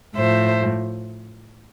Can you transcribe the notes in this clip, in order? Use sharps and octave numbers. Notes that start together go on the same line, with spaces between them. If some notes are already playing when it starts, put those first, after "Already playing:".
A2 F3 C5 E5